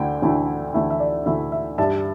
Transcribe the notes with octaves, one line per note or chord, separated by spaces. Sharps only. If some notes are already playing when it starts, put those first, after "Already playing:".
Already playing: D2 D3 A3 E4 G5
D2 D3 A3 E4
D2 D3 A3 E4 E5
E5
D5
D2 D3 A3 E4 E5
E5
G2 G3 D4 E5 A5